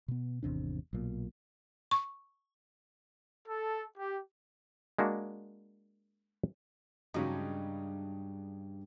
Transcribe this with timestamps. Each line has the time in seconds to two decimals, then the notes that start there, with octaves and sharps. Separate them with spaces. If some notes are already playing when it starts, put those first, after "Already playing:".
0.08 B2 B3
0.43 G#1 E2 C3 D4
0.93 B1 A#2
1.91 C#6
3.47 A4
3.97 G4
4.98 G#3 A#3 D4 F#4
7.14 G2 C#3 F#3 G#3 D#4